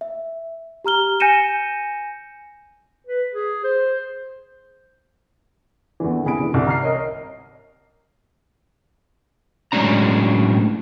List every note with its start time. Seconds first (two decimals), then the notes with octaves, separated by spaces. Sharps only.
0.01 E5
0.84 G4 A#5 F6 G7
1.20 G#5 G6 A#6 C#7 D#7 E7
3.07 B4
3.33 G#4
3.64 C5
6.00 E2 D3 E3
6.25 C3 G#4 B5 D7
6.38 D3 E3
6.54 C2
6.67 A#5 F6 C7
6.82 A#4 C#5 D#5
9.72 A2 F#3 G#3 C#4 D4 A#5